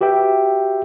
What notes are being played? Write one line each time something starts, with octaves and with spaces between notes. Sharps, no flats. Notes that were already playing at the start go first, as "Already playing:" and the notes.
F#4 G4 B4 E5 G5